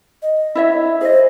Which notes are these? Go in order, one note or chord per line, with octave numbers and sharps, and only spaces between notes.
D#5
E4 C#5 E5
G#4 C5 D#5